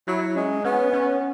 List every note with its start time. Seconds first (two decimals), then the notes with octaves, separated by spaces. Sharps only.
0.07 F#3 E4
0.36 G#3 C#4
0.64 B3 C#4
0.93 C#4